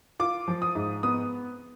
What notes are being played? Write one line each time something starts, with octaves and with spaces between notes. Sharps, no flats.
F4 D6
F3
D#6
G#2
B3 D#6